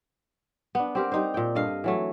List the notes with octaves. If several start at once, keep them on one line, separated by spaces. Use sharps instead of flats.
B3 D4
C4 G4 A#4
G3 D#4 C5
A#2 G5
G2 A4 D#5 F5
E3 F#3 A3